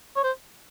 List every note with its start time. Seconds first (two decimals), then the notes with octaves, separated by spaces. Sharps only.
0.16 C#5
0.24 C5